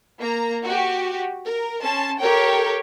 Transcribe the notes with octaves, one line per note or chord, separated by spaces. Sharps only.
A#3 A#5
F#4 G4
A#4
C#4 A5 C6
G4 A4 A#4 C#5 G5